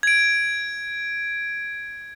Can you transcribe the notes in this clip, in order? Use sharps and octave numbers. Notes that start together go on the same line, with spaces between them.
G#6 D7